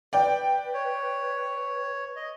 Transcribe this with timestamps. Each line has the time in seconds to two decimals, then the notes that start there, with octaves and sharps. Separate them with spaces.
0.13 B4 D5 G5
0.74 C#5
2.16 D#5